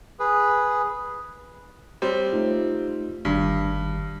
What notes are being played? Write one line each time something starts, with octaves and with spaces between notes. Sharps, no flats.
G#4 B4
G3 C4 C#5
A3 D#4 F4
G1 G2 D#3 G3